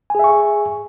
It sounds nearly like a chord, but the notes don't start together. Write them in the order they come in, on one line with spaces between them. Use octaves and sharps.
G#5 G#4 E5 C#6